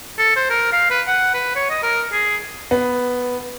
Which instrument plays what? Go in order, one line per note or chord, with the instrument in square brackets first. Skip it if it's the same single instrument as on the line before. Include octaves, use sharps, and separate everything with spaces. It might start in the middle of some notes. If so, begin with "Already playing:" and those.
[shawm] A4
C5
A#4
F5
B4
F#5
B4
C#5
D#5
A#4
G#4
[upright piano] B3